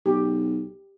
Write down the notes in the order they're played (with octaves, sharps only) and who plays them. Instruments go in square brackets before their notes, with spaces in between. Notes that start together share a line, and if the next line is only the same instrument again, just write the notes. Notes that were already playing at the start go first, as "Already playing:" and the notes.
[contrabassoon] B1 [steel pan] G4